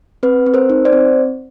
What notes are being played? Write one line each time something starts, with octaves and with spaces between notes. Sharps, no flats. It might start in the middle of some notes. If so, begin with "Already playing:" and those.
C4 B4
C4
A#4 C5
D#4
C5 D5
C4